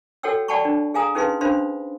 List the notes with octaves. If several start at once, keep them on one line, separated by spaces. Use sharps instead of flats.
F#4 A4 C#5 F#5 G5 E6
D5 F#5 G5 A5 B5 C#6
D4
G#4 F5 G#5 A#5 D#6
C#4 D#4 G#4 B4 F5 C6
C#4 D4 C5 F5 B5 C6